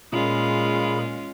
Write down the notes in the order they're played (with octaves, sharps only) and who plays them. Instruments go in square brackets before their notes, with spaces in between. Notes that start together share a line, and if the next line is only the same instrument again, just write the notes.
[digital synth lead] A#2 [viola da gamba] G#3 C#4 F4 [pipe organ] G#4 B5